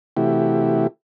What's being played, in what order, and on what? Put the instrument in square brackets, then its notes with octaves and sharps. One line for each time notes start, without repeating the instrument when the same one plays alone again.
[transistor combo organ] C3 E3 A3 E4 F#4 G4